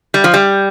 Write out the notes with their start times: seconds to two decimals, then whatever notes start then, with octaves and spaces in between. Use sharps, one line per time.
0.14 G3
0.24 F3
0.34 G3